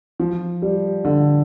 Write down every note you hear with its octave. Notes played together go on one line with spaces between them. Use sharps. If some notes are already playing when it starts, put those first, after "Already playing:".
F3
G3
D3